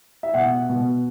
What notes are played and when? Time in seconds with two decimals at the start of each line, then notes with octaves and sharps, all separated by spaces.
0.23 E5
0.34 B2 F#5
0.69 B2